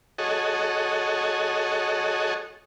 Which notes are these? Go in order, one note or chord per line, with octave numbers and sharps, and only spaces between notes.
F#4 G#4 A4 C#5 D#5